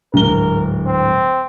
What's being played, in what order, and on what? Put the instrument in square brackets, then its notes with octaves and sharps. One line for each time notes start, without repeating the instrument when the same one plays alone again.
[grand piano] D1 G#2 G7 [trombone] A#4
[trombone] C4